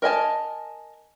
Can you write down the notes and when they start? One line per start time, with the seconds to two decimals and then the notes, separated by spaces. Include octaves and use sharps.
0.02 A#4 D#5 G#5 A5